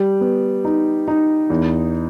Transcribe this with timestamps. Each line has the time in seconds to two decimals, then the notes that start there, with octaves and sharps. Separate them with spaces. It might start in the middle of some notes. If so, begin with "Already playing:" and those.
Already playing: G3
0.21 B3
0.65 D#4
1.08 D#4
1.50 E2